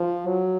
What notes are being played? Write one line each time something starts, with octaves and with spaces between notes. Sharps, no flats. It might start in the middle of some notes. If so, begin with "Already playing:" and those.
Already playing: F3
F#3